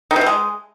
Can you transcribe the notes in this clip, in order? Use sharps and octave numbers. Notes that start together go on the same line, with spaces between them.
D#3
C3
E3
G#3